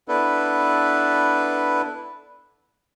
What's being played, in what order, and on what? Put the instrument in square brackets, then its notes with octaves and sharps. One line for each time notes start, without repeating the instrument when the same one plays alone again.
[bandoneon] B3 D4 E4 A4 B4